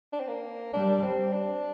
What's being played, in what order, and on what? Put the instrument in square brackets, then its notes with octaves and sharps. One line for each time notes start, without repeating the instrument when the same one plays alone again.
[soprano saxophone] D4
C4
A#3
[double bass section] G3 [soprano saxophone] D4
[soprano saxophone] C4
D4